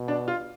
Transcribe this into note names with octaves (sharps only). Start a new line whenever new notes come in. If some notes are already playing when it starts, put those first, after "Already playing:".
Already playing: B2
D4
F4